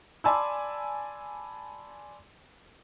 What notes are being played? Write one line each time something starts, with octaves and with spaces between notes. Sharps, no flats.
D5 G#5 A5 B5 C6 E6